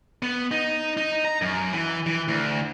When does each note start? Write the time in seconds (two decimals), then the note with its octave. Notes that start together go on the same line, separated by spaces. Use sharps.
0.23 B3
0.51 D#4
0.97 D#4
1.25 A#5
1.42 F#2
1.73 E3
2.06 E3
2.28 D2